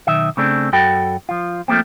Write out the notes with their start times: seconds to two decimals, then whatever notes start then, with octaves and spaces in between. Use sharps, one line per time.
0.07 B1 D#3 E5
0.37 C#3 A3 C4 D4
0.73 F#2 F#4 A4 G5 B5
1.29 F3 F4
1.68 F3 A3 A#3 C4